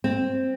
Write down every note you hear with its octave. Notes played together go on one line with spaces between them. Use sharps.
C4